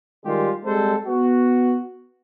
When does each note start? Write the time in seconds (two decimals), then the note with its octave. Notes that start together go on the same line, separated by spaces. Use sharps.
0.25 D#3 G3 G#3 F4 G4
0.65 G3 G#3 C4 A4 C5
1.07 B3 F#4